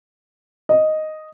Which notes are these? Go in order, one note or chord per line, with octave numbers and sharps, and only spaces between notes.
D#5